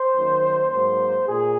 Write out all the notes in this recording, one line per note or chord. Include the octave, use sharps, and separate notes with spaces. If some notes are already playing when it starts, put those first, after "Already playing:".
Already playing: C5
F#2 D#3 A#3
G#2 F#3 A#3 C5
A#2 G#4